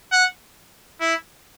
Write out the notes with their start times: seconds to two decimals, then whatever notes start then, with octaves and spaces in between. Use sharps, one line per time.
0.12 F#5
1.01 E4